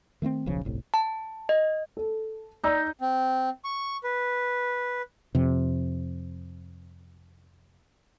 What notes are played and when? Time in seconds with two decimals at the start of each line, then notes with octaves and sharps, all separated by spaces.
0.22 D#3 A3 B3 C4
0.46 D#1 B1 C#3 F3
0.65 G1 C2 A2
0.94 A5
1.49 D#5
1.97 A4
2.63 D#4 D5 E6 G6
3.01 C4
3.64 C#6
4.03 B4
5.35 F2 C3